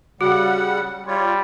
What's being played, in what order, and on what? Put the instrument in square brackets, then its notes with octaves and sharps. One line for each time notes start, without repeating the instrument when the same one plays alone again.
[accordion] C#3 G3 F#5 [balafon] F#4
[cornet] G3 [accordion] F4 C#5